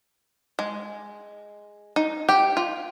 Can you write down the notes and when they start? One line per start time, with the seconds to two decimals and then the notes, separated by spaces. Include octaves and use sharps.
0.59 G#3
1.96 D#4
2.29 G4 G5
2.57 F4